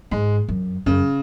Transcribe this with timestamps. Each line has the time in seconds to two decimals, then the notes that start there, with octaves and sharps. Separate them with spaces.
0.11 G#2 G#3
0.49 F#2
0.86 F#2 C#3